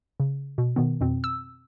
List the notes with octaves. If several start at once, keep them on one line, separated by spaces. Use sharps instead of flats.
C#3
B2
B2 D#3 B3
F2 B2 C4
E6